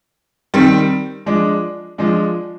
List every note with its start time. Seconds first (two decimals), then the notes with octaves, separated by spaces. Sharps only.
0.54 D#3 G3 C4
1.26 F3 G#3 D4
1.98 F3 G#3 D4